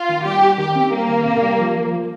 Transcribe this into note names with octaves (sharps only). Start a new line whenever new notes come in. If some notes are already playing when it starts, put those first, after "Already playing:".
Already playing: F4
D#3
G3 G4
G3
D#3 G4
C4
G3 A#3
D#3
C3
G3
F3
F3
F3